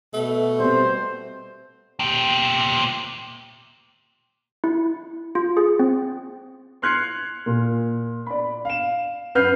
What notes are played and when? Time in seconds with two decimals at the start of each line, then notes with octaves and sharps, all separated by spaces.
0.13 B2 A3
0.60 G3 C4 C5
2.00 A#2 G4
4.64 E4
5.35 F4
5.57 G#4
5.79 C4
6.82 C6 F6 F#6 G#6 C7 C#7
7.46 A#2
8.26 D5 B5
8.65 F5 E7
9.35 F#2 B4 F#5 F6 G6 C7